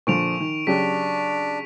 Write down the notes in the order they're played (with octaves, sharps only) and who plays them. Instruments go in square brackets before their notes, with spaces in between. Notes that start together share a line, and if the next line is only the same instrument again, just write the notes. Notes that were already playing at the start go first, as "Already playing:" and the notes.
[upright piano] A#2 D3 F3 [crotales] C#6 D7 F7
[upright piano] D#3
[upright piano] C#3 F#3 G4 [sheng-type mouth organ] D4 [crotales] B6